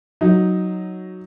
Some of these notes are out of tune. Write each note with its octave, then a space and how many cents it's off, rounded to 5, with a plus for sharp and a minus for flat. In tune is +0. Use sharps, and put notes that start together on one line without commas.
F#3 +0 D#4 +0